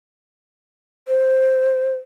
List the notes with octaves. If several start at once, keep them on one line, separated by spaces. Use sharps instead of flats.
C5